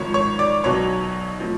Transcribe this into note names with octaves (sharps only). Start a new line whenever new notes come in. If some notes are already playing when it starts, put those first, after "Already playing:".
Already playing: G#1 G#2 F3 C#5 C#6
C#5 C#6
D5 D6
B1 B2 F#3 C#5 C#6
A2 F3